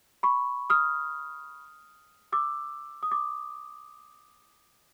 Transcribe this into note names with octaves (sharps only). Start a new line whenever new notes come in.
B5 C#6
D#6 F6
D6 E6
D#6
D6